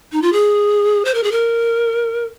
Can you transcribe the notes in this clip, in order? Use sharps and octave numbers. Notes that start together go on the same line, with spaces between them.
D#4
F4
G#4
C5
A#4
G#4
A#4